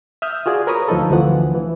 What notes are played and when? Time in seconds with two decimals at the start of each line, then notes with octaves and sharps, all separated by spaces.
0.22 E5 D#6 F6 G6
0.46 F4 F#4 G#4 D5 G#5
0.67 A#4 B4 C#5 B5 C#6 D#6
0.88 D2 F3 D#4 A4
1.11 D2 E3 F3 F#5
1.55 E3